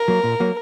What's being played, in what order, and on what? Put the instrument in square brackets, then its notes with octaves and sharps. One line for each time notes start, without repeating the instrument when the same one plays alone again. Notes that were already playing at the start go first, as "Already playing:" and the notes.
Already playing: [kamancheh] A#4
[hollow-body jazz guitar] F#3 A#3
A#2
F#3 A#3